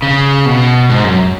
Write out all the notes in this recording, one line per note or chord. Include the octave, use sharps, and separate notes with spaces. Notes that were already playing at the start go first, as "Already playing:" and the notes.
C#3
B2
G#2
F#2